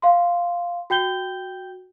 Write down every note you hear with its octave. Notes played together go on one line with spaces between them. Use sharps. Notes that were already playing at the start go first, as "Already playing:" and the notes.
F5 C6
F#4 G5 G6 G7